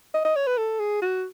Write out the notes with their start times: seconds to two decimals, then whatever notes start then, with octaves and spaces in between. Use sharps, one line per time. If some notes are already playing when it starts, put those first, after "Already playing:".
0.14 D#5
0.25 D#5
0.36 C#5
0.47 B4
0.57 A4
0.80 G#4
1.02 F#4